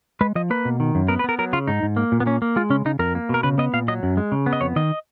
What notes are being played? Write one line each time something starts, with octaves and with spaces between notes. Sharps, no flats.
G#3 B4
F3 D#5
A#3 B4
B2
D#3
F#2
B3 A#4
B4
B3 A#4
F#3 A#4
C#3 F4
G#2 D#4
G#2
A#3
A#2
B3
A#3 C#4
A#3
G#3 F4
C#3 C#4
C#3 D#4
F2 A#4
A#3
B2 A#4
C#3 B4
B3 D#5
A#2 F5
F#3 D#5
F#2
G#3
C#3
B3
D#5
F2 C#5
D#3 D#5